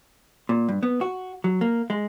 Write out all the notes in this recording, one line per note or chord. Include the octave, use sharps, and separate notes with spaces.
A#2
G2
B3
F#4
F#3
A#3
G#3